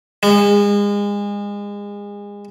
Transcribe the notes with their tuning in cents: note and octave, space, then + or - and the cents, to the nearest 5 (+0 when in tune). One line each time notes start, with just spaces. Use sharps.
G#3 -30